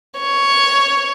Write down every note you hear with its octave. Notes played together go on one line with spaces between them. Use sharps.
C#5